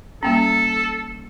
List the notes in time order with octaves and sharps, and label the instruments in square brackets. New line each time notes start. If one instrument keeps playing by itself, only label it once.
[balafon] G3 A#3 C#4 [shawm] A4